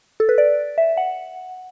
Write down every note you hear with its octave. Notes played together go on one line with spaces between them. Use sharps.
A4
B4
D5
E5
F#5